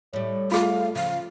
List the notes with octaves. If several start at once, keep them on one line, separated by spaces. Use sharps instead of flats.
A2 G3 C#5
A3 F4 G#4 F5
C#3 F3 F5